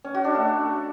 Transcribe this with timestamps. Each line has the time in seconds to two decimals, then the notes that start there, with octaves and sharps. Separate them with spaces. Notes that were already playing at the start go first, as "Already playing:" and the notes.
0.04 C#4
0.15 F#4
0.25 D4
0.35 A3